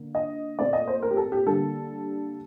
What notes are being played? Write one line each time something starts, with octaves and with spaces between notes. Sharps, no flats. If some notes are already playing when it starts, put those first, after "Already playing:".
Already playing: D3 A#3
D#5
A#2 A3 C4 D5
D#5
C5
A#4
G4
A4
G4
D3 G3 A#3 A4